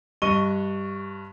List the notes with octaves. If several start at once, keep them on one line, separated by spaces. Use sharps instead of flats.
G2 D#5 C#6 D#7 G7